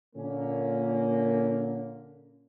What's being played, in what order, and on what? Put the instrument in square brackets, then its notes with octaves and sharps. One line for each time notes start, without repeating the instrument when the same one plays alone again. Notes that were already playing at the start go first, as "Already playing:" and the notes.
[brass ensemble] A#2 D3 A#3 C#4